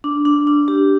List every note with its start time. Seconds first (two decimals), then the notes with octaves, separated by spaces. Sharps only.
0.04 D4
0.25 D4
0.47 D4
0.68 G4